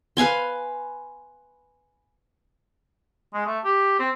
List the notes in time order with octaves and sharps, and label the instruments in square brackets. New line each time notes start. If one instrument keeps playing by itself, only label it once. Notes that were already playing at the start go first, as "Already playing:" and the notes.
[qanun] B4 F5 G#5 C6
[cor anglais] G#3
A3
G4
C4